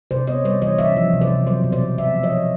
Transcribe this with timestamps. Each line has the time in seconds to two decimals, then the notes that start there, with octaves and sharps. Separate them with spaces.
0.11 C3 C5 D5
0.27 B3 C#5 D#5
0.45 G3 C5 D5
0.62 E3 C#5 D#5
0.78 C#4 D5 E5
0.97 F3
1.13 C3
1.21 C5 D5
1.30 C3
1.47 F#3 C5 D5
1.64 B2
1.72 C5 D5
1.81 C4
1.98 G#3 D5 E5
2.15 F3
2.23 C#5 D#5
2.32 F3